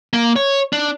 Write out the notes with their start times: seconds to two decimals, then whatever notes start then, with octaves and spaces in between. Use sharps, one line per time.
0.13 A#3
0.36 C#5
0.73 D4